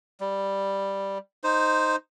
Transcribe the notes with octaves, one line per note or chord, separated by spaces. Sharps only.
G3
D#4 C5